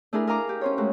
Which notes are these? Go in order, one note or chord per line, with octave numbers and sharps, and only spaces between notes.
A3 D4 E4 G#4 A#4
A#4 D#5 F5 A#5 D6
G4
C#4 C5 C#5
G#3 A3 F#4